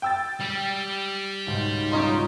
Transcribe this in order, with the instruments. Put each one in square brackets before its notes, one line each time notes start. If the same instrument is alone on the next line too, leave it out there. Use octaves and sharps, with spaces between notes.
[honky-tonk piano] G5 E6 A6
[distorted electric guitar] G3 G4
[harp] C#2 G#2 B2
[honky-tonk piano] C#4 D#4 C6 [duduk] F4